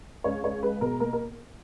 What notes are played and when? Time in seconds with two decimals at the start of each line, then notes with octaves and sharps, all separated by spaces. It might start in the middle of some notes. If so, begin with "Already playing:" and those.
0.24 C#2 C#5
0.44 C#2 C#5
0.63 G#3 B4
0.81 B2 A#4
1.00 A#3 A#4
1.13 A#4